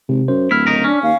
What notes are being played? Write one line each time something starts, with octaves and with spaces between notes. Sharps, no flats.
G#1 C3
F#2 C5
D1 E4 F6 B6
C#3 D#4 A#4
C#4 D4
D#2 F5